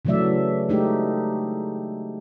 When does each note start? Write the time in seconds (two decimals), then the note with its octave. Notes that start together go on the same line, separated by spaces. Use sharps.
0.05 C#3 E3 F#3 A3 D5 E5
0.69 G#3 A3 D#4 G4